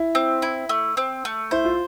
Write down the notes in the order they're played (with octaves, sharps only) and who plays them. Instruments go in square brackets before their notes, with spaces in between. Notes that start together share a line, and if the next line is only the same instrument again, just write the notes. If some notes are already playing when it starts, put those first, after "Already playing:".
Already playing: [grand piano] E4
[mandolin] C4
E4
A3
C4
A3
[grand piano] E4 [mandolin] C5
[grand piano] F4